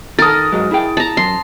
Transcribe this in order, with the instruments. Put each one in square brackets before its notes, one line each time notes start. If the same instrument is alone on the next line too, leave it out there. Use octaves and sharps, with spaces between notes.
[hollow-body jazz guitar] D#3 A4 [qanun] A#4 [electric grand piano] D#6 A6
[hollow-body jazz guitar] G#2 F#3 G#3
E4 G#4 G5
[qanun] A5 A#5
[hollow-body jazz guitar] F#2 [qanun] C6